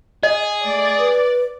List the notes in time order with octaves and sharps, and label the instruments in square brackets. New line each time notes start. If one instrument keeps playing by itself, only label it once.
[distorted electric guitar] G#4 [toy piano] D#5
[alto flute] A3 [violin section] D5
[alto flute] B4